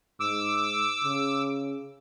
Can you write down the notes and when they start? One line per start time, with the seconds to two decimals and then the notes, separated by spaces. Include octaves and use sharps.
0.20 G#2 D6 E6
1.04 C#3